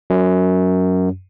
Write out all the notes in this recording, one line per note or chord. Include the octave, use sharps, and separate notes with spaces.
F#2